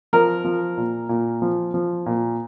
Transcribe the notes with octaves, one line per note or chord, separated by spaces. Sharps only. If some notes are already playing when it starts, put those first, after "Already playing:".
F3 A#4
F3
A#2
A#2
F3
F3
A#2